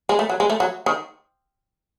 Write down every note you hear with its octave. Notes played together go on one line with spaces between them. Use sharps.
G#3
A3
F#3
G#3
A3
F#3
D#3